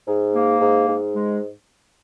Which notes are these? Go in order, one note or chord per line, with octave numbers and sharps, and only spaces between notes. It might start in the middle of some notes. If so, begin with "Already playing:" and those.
G#2
A#3
G#2
G#2
G#3